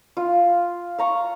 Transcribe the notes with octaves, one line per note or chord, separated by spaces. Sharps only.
F4
F5 A#5 C#6